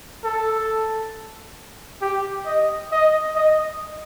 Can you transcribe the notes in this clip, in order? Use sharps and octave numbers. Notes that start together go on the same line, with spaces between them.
A4
G4
D#5
D#5
D#5